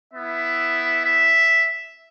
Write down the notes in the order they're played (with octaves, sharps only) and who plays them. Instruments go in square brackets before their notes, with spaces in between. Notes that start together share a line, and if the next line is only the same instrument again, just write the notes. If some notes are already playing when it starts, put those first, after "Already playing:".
[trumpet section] B3 E4 E5
E5